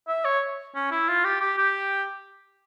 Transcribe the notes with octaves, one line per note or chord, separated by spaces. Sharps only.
E5
C#5
C#4
E4
F4
G4
G4
G4